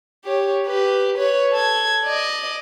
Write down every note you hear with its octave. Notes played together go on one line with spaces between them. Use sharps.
G4 C#5
G4 B4
B4 C#5
A4 G#6
D5 D#5